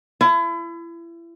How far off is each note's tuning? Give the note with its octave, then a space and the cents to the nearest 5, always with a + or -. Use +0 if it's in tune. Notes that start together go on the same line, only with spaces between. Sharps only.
E4 +35